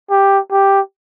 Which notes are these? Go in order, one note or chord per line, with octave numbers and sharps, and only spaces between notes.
G4
G4